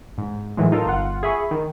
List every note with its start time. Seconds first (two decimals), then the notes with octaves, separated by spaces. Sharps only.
0.18 G#2
0.57 A2 D#3 E3 F#3 G#3
0.72 D#4 F4 A4 A#4
0.86 G1 F4 F#5
1.23 G#4 E5 B5 C#6
1.51 D#3